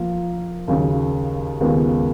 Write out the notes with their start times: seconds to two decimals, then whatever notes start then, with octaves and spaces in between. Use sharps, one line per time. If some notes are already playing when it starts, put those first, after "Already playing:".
Already playing: F3 A#3 F4 A#4
0.68 D#2 C#3 F#3
1.61 D#2 C#3 G#3 B3 F4